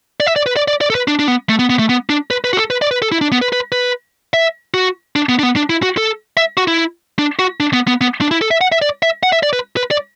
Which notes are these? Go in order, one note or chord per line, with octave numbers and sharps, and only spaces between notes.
D5
E5
D5
B4
D5
D5
D5
A4
B4
D4
D4
B3
A3
B3
B3
A3
B3
D4
B4
B4
F#4
A4
B4
D5
B4
A4
E4
D4
B3
B4
B4
B4
E5
F#4
D4
B3
D4
B3
D4
E4
F#4
A4
E5
F#4
E4
D4
F#4
D4
B3
B3
B3
D4
E4
A4
E5
F#5
E5
D5
E5
F#5
E5
D5
B4
B4
D5